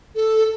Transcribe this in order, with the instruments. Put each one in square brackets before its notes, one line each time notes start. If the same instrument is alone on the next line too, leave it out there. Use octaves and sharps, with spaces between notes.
[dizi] A4